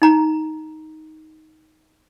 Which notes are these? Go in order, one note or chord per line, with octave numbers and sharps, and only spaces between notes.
D#4 A#5